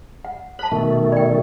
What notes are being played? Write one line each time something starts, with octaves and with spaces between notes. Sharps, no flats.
F#5
C5 A5 B5
B2 D#3 A3
D5 G5